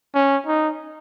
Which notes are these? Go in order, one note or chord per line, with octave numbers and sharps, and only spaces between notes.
C#4
D#4